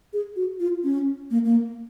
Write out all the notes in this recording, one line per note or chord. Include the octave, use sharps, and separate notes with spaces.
G#4
F#4
F4
C#4
A#3
A#3